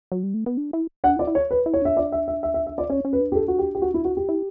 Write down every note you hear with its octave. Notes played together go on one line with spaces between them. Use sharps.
F#3
G3
A3
B3
D4
E4
D4 F#5
E4
D5
E4
C#5
B4
E4
C#5
D4 E5
D5
E5
E5
E5
E5
E5
D5
C#4 C#5
C#4
B4
D4
G4
A4
F#4
G4
G4
F#4
E4
F#4
G4
E4